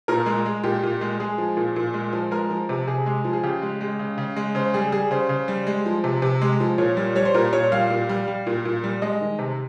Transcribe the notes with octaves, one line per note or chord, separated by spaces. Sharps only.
A#2 A#4
G#3
G#3
A#2 G4
A#2
G#3
G#3 G#4
F3
A#2
A#2
G#3
F3
G#3 A#4
F3
C3
C3 G#4
G#3
F3
G#4
C#3 G4
G#3
G#3
C#3
C#3
G#3
C#3 C5
G3 G#4
G3 G#4
C#3 C5
C#3
G3
G#3
F3
C3
C3
G#3
F3
A#2 C#5
G3
G3 C#5
C5
A#2 A#4
A#2 C#5
G3 F5
A#2
G3
G3
A#2
A#2
G3
G#3 D#5
D#3
C3